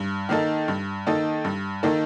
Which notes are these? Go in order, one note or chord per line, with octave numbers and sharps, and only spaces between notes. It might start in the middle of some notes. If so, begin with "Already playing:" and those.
Already playing: G2
D#3 A#3 D#4 A4
G2
D#3 A#3 D#4 A4
G2
D#3 A#3 D#4 A4